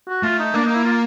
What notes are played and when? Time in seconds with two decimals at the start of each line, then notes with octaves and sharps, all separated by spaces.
0.08 F#4
0.23 A3 F4
0.39 D#4
0.54 A#3 D4
0.65 D#4
0.75 E4
0.84 F4